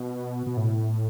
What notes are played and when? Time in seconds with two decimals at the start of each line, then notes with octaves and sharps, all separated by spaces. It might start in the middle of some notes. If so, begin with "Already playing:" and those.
Already playing: B2
0.47 B2
0.57 A2